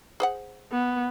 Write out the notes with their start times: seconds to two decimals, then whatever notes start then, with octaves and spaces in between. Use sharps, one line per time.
0.20 G#4 C5 F#5
0.71 B3